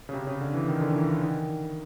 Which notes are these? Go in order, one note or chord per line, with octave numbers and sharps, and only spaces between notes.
C#3
C3
C#3
D3
E3
D#3
D3
E3
D#3